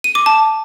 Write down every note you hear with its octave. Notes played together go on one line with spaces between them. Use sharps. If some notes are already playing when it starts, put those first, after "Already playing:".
D#7
D6
A5